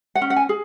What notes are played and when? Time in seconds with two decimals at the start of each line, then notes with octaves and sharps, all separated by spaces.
0.15 F#5
0.22 C#4
0.30 F#5
0.36 G#5
0.49 G#4